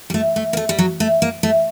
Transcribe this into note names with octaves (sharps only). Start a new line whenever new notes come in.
G3
A3
A3
A#3
A3
G3
F#3
A3
A#3
A3